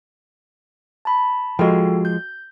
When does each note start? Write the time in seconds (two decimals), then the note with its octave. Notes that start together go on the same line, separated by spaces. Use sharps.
1.05 A5 B5
1.59 F3 G#3 F#4 A4 G5
2.05 G6